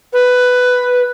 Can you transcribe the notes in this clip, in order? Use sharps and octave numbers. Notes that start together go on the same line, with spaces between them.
B4